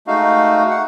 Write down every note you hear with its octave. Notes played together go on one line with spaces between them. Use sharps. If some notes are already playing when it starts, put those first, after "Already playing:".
G#3 A3 D#4 F#4 F5
F#5